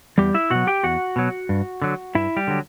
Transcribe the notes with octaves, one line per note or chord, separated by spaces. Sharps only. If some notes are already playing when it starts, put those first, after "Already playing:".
E2 G3 G4
E4 E5
B2 F#3 F#4 F#5
G4 G5
E2 F#4 F#5
B2 F#3
G2
D3 F#3
G2 E4 E5
G3 G4
D3 F#3